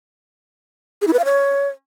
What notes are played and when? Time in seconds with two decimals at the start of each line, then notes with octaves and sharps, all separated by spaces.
1.01 G#4
1.07 E4
1.13 B4
1.19 F5
1.25 C#5